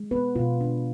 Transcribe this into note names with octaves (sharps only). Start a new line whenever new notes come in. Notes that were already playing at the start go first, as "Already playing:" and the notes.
Already playing: G#3
B3 B4
B2 F4
D4